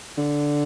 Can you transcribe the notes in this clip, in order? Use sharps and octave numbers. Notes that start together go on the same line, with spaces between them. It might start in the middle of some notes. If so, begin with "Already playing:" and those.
D3